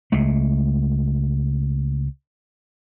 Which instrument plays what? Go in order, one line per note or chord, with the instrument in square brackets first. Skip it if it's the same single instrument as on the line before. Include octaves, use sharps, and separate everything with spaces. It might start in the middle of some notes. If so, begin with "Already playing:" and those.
[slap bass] C#2 G#3 A3